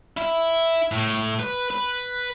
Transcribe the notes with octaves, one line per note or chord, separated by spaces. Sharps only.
E4
A2
B4
B4